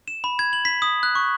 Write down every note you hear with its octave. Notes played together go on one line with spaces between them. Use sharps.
E7
B5
G#6
F#7
B6
D#6
F#6
C#6